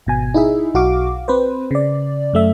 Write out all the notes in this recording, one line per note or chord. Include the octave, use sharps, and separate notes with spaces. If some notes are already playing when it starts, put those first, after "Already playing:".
G#1 B2 G#5
D#4 E4 G#4 E5
B1 F#4 F5 D6
C4 B4 C5
C#3 D5
F#2 A3 E5